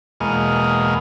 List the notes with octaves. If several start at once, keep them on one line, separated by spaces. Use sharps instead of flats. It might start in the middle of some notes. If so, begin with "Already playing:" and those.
E2 B2 G#3 A#3 D#5 F6